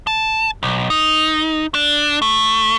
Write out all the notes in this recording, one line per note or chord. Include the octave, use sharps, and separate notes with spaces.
A5
B1
D#4
D4
A3